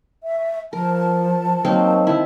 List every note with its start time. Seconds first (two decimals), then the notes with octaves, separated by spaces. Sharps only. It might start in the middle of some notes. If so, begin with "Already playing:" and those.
0.23 E5
0.73 F3 A#4 A5
1.65 F#3 A#3 C4 D#4
2.07 D#3 E4